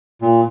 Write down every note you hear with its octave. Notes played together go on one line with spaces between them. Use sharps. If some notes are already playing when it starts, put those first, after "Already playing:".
A#2